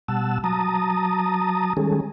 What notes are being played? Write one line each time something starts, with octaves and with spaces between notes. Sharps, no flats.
B2 G3 F#5 A5 E6
F#3 A5 A#5 D#6
D#3 G3 G#3 C#4 G#4 A4